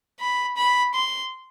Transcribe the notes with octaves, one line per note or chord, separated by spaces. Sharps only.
B5
B5
C6